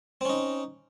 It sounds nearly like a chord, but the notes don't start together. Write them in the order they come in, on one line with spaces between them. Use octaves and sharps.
C4 C#4 D#4